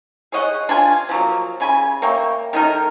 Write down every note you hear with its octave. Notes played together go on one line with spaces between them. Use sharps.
G#4 C#5 D#5 F#5
D4 F4 G#5
F3 F#3 A#3
C#3 G#5 B5
A#3 C#5 E5 G5
D#3 A3 D#4 A#4